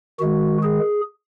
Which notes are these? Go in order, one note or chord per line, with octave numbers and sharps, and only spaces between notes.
D#3 G#3 F#4
G#4